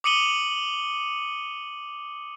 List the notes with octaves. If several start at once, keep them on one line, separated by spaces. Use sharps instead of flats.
D6 D#6 C#7 D#7 F#7 G7